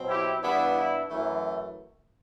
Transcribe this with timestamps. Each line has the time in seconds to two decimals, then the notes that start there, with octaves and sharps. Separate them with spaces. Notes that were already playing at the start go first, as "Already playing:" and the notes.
Already playing: B2 F#3 C4
0.08 E4 G4
0.42 G2 E3 B3 D4 E4
0.76 E4
1.10 F#2 E3 A3